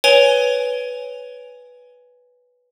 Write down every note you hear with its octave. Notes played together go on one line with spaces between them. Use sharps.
B4 C#5 G#5 D7 F7 G7